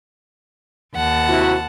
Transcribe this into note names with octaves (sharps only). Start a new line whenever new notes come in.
D#2 F#5 A5
C3 E4 F#4